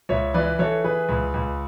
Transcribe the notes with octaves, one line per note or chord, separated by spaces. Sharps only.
C#2 C#5 E5
E3 B4 D5
E3 A4 C#5
E3 G#4 B4
C#2
C#2